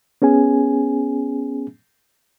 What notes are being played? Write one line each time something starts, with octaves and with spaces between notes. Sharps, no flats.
B3 C#4 G#4 G#5